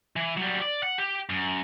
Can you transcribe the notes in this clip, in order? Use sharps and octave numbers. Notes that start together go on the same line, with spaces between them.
E3
F#3 G3
D5
F#5
G4
F#2